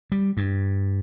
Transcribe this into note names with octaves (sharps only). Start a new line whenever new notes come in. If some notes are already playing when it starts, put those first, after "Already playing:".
G3
G2